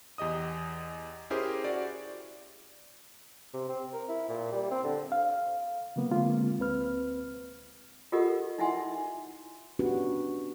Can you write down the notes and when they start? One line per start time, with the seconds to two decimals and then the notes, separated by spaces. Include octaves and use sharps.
0.18 E2 G4 D#5 D#6
1.30 C#4 E4 G4 G#4 A#4 C5
1.64 F#4 D5
3.54 C3
3.69 C4
3.93 A#4
4.09 E4
4.29 A#2
4.52 G3
4.71 C4
4.84 D3
5.12 F5
5.96 C#3 F#3 A#3 B3
6.11 D3 G#3 A#3 C4 F4
6.59 D2 C4 B4 F6
8.12 F4 G4 A4 A#4 D#5 F#5
8.58 D#4 E4 E5 F#5 G#5 C6
9.79 B3 C#4 D4 F#4 G4 B4